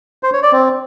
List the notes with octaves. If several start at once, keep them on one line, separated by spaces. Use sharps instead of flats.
C5
C#5
D5
C4